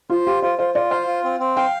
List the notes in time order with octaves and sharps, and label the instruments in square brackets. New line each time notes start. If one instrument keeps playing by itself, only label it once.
[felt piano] F4 [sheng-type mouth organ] C5
[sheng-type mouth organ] F4 [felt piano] G4
[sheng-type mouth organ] F4 [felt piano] C5
[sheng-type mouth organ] F4 [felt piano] C5
[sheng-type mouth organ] F4 [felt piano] D5
[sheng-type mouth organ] C5 [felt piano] F5
[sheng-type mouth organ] F4
C4
C4
[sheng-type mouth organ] F5 [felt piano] G5